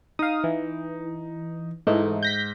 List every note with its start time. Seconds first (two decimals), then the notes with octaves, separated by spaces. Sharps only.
0.19 D#4 F5 D#6
0.44 E3
1.87 G#2 E3 A3 D#4
2.23 G6 A#6 B6